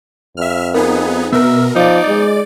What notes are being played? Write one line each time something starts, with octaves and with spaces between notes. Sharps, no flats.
F2 E5 F6
B3 D#4 G#4 A#4
B2 B3 A#4 E5
F3 D#4 D5 D6
G#3